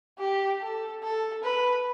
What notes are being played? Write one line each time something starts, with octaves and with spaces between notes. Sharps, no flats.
G4
A4
A4
B4